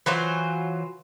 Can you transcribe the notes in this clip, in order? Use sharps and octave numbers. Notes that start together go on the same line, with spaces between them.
E3 F#3 F4 C5